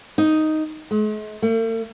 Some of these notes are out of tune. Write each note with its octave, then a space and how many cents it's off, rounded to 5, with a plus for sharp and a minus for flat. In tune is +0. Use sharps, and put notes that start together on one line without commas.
D#4 +0
G#3 +45
A3 +45